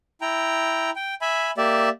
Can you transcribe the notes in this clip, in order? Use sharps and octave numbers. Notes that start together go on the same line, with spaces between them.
E4 G5 A#5
G5
E5 G#5 B5
A#3 G4 D5 E5